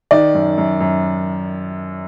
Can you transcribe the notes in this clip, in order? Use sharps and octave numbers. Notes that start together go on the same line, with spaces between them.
D#3 D5
F#2
F#2
F#2